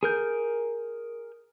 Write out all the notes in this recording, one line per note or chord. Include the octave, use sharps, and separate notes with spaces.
G#4 A#4 G6